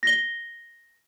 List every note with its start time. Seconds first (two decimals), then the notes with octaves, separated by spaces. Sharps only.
0.03 A#6 G7